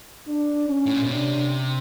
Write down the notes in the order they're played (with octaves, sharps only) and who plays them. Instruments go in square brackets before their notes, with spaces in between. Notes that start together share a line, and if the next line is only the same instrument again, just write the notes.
[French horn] D4
C#4
[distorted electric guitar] A2
A#2
B2
[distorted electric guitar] C3 [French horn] D4